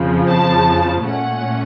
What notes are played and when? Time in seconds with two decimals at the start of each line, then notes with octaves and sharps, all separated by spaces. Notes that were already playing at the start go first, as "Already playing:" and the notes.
Already playing: F2 C#3 F3
0.29 A5
1.06 A#2 A3 C#4 F#5